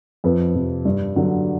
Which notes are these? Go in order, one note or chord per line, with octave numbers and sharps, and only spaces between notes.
F2 B4
C3 F3
G2
D3 F#3